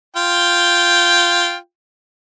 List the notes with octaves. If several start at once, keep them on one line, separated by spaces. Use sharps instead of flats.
F4 G5